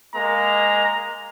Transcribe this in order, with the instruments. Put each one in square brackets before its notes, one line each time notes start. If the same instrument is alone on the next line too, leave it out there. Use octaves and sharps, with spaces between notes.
[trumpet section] G#3 A#3 A#5